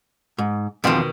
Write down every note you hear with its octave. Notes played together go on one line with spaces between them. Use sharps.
G#2
E2 B2 D#3 F3 C4